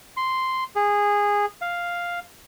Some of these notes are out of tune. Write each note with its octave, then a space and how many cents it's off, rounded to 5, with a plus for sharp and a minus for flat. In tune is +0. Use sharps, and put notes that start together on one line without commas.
C6 -5
G#4 -15
F5 +0